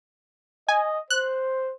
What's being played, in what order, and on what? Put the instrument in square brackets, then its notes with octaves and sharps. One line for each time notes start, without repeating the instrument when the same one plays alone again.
[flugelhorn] D#5 [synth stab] G#5
[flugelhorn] C5 [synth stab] F#6